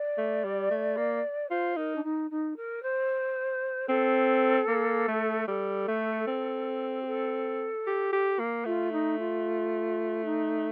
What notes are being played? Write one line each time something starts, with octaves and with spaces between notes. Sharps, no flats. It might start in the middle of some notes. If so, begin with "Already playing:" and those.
Already playing: D5
A3
G3
A3
A#3
F4 C5
D#4 A#4
D4
D#4
D#4
A#4
C5
C4 A4
A#3
A3
G3 A4
A3
C4
G4
A4
G4
G4
A#3
A3 F4
D#4
F4
D#4